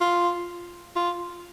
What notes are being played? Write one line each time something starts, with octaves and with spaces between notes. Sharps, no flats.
F4
F4